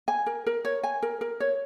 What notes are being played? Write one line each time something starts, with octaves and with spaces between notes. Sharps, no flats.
G#5
A#4
A#4
C#5
G#5
A#4
A#4
C#5